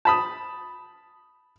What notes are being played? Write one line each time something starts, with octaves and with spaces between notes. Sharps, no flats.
A5 B5 D#6